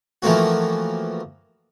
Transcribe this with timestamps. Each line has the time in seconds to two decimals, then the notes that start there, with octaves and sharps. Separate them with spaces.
0.22 E3 F3 A3 A#3 C4 F#4